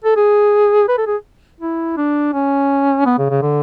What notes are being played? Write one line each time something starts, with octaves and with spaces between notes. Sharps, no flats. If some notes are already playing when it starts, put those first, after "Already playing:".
A4
G#4
B4
A4
G#4
E4
D4
C#4
B3
C#3
C#3
D3